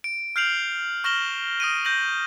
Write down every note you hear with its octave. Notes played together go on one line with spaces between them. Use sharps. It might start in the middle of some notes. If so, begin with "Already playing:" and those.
D7
F6 G6 C7 D7 F7 F#7
C#6 F6 A#6 E7 F#7 G7
D#6 A#6 D7 D#7
G6 A#6 F#7